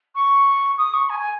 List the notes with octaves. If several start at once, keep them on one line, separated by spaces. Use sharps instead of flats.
C#6
D#6
C#6
G#5
G#5